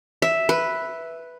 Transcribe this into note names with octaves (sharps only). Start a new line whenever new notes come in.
E5
B4